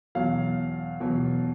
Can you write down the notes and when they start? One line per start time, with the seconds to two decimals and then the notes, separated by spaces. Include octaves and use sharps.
0.15 E2 B2 F#3 F5
1.00 E2 B2 F#3